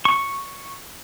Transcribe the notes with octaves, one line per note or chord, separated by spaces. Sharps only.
C#6